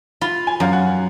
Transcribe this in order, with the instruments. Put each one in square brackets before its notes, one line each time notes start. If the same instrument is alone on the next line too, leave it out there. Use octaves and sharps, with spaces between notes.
[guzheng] F4 [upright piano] B5
[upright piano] G#5
[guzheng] F#2 [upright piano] F5
[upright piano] F#5